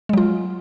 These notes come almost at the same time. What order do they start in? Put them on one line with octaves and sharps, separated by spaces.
G#3 F#3 F4